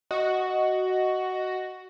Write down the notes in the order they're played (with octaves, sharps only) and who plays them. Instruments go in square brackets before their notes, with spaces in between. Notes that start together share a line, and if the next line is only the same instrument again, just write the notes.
[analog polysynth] F#4 [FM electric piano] D#5